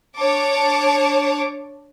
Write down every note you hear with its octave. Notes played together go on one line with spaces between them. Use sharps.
D4 C#5 A5 D6